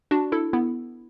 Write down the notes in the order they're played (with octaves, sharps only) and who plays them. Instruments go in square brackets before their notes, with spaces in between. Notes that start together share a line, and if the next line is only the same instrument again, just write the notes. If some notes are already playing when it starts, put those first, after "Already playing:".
[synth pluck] D4 F#4
E4 A4
B3 E4